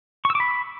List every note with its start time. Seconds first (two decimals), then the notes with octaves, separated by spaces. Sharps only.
0.25 C#6
0.30 E6
0.35 D6
0.40 B5